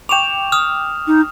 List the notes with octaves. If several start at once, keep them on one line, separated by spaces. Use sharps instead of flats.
G5 C#6 D6 E7 F7
D#6 F6
D#4